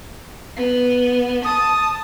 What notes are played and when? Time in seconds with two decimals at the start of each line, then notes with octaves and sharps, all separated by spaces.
0.56 B3
1.45 A5 D#6